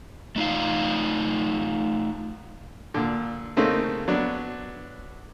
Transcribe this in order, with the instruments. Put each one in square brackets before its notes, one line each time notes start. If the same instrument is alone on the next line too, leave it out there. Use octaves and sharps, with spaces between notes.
[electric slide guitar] A3 D#4 F4 F5
[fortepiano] A#2 D3
C#3 A3 A#3 C4 C#4 D#4
F#3 B3 D4